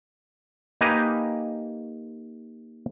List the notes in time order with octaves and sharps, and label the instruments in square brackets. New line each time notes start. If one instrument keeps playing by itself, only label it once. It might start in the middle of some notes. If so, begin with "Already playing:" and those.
[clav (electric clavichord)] A#3 D#4 G4 B4 G#5 A#5